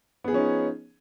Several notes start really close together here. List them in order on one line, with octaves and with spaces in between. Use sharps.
B3 G#4 F3 C#4 D#4